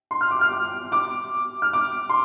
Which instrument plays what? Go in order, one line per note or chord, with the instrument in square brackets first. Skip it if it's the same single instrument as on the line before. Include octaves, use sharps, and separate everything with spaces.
[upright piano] C6
F6
D6
F6
D6
D6
F6
D6
C6